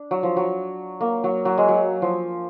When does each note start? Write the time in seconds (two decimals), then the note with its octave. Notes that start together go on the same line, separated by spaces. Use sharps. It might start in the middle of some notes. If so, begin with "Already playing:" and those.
Already playing: D4
0.11 F#3
0.23 F3
0.37 F#3
1.01 A#3
1.24 F#3
1.45 F#3
1.58 G#3
1.68 F#3
2.02 F3